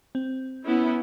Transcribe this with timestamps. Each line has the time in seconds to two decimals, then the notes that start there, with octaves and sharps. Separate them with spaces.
0.15 C4
0.66 B3 C#4 E4